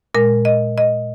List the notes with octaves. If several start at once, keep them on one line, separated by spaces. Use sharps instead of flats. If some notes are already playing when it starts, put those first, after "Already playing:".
A#2 G#3 A#4
D#5
D#5